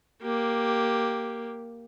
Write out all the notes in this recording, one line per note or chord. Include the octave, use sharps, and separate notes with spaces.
A#3 G4